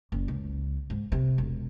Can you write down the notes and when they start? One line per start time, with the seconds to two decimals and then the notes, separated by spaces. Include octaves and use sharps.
0.12 F#1
0.28 C#2
0.90 G#2
1.12 C3
1.38 E1